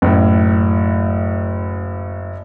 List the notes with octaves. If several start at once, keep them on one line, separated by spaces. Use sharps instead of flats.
F#1 A2